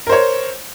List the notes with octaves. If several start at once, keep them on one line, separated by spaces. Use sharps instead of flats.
A#4 C5 C#5